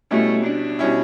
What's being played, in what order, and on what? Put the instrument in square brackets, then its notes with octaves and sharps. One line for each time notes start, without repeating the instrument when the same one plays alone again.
[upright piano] B2 G3 C#4 E4 [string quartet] A3
[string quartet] D4
[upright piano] B2 G3 C#4 E4